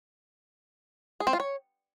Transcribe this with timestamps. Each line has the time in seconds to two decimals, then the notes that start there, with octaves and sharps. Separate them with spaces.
1.20 G#4
1.27 C4
1.33 F4
1.40 C#5